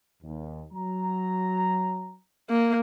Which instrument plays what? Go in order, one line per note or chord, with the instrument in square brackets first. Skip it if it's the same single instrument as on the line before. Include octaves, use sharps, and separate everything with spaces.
[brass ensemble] D#2
F#3 A#5
[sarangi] A#3